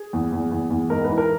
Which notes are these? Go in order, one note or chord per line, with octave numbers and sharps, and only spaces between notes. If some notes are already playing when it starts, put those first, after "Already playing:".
Already playing: G#4
E2
E2
E2
E2
G#2 A#4
B4
E3
A#4